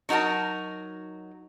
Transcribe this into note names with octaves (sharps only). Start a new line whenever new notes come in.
F#3 D#4 F#4 A#4 A5